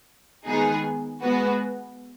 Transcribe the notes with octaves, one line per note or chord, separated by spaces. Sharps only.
D#3 G#3 B3 D#4 G#4
G#3 B3 F#4 B4